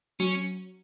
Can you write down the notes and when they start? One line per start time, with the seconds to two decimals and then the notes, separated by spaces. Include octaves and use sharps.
0.20 F#3 C#4